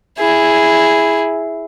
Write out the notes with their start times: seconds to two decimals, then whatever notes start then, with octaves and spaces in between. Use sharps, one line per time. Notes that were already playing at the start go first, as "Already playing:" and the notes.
0.19 E4 G#4